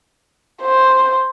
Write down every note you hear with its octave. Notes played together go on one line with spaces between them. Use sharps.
C5